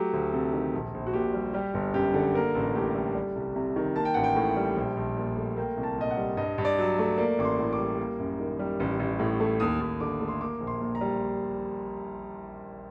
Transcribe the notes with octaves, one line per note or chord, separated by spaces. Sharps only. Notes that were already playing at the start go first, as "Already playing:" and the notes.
Already playing: F#3 A3 G4
D2
C3 A4
D#3
A#1
A#1
F#4
A#2 G4
G3
G3 G4
G1
F#2 G4
D3
A#3 A#4
A1 A4
A2 G4
G3 A4
G3
C2
C3
D#3
A#3 A5
G5
A1 F#5
G5
A2
G3
A#1
A#1
A#2
A3
A#3 G5
C2
A5
A#2 D#5
F#5
G3
G2 D#5
G2
D5
F#3
A3
A#3 D5
A1 D6
C6
A2
D6
G3
A#3
F#2
D#3
G3
A1
A1
A2
A3
D#2 D#6
D#2
D3 D6
A3
C6
A#3 D6
A#1
C6
A#2
A#5
G3